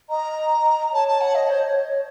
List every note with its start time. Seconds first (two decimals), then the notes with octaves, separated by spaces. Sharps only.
0.09 D#5 A#5
0.93 C#5 A5
1.08 A5
1.21 F#5
1.35 D#5
1.49 C5